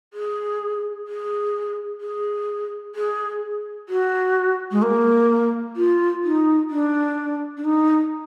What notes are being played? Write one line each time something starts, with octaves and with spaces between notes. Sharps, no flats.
G#4
G#4
G#4
G#4
F#4
G#3
A#3
F4
D#4
D4
D4
D#4